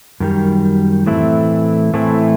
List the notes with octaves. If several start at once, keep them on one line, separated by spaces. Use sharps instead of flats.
F#2 D#3 G3
A2 E3 A3 C4 E4
A2 E3 A3 C4 E4